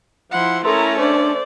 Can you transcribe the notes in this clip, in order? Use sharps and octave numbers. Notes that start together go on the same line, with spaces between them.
F3 E4 F#5 C6
A3 C#4 E4 A4 A#4 A#5 C6
D4 C5 D5